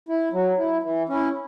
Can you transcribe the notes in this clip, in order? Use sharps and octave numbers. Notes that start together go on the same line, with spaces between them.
E4
F#3
E4
E3
C#4 E4